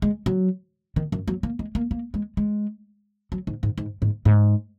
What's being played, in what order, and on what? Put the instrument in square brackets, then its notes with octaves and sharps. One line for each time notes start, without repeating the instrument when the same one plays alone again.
[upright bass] G#3
F#3
D#3
F#2
F#3
A#3
G#3
A#3
A#3
G#3
G#3
F#3
G#2
G#2
G#2
G#2
G#2